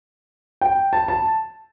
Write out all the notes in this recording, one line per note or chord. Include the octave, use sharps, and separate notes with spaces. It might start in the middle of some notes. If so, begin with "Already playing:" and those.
G5
A5
A5